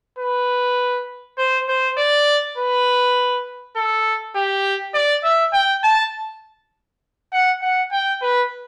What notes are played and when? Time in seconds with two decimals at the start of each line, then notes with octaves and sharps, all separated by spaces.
0.19 B4
1.38 C5
1.68 C5
1.98 D5
2.57 B4
3.76 A4
4.36 G4
4.95 D5
5.24 E5
5.53 G5
5.84 A5
7.33 F#5
7.62 F#5
7.92 G5
8.22 B4